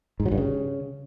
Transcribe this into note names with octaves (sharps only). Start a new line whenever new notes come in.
G#2
F#3
G2
C#3